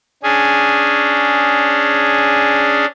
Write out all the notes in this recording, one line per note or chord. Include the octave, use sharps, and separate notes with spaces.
C#4 D4 G#4